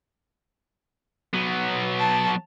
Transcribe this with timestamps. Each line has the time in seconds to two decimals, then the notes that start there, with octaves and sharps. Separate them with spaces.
1.34 F#3 B3
1.99 A5